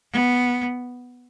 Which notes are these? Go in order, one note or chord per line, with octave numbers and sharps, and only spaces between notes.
B3